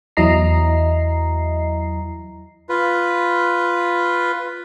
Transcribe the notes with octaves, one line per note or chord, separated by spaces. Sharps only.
E2 F#3 E4 D#5 A#5 C7
F4 B4